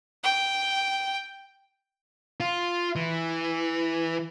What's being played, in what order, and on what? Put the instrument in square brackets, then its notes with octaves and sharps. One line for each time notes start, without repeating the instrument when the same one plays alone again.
[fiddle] G5
[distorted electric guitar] F4
E3